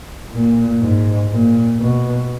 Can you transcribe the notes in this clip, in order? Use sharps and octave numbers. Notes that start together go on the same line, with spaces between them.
A#2
G#2
A#2
B2